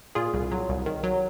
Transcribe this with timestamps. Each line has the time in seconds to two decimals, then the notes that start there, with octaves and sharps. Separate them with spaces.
0.15 A#2 F4 G#4
0.34 C2
0.52 F#3
0.69 C2
0.86 D#3
1.03 F#3